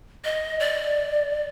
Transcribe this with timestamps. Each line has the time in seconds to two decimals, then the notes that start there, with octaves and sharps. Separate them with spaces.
0.24 D#5
0.60 D5